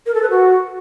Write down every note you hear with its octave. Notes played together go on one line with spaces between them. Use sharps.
A#4
A4
B4
F#4